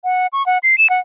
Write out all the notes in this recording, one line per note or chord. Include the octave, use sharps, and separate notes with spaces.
F#5
C#6
F#5
C7
E7
F#5